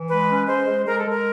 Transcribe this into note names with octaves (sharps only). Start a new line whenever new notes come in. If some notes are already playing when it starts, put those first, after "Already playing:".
Already playing: E3
G#3 B4
C#4
G#3 C5
G#3
G#3 A#4
A4
G#3
A#4